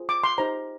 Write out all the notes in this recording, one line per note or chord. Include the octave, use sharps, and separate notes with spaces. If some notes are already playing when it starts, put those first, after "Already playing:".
Already playing: F4 G#4 C5
D6
C6
D#4 G4 C5 A#5